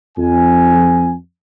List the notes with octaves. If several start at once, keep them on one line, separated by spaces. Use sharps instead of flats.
F2 G#5